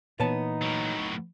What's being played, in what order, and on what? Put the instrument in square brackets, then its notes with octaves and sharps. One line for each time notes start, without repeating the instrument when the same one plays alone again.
[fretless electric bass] A#2 E3 [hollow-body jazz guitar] B3 C#5 A5 [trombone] D#4
[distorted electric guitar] A2 F#3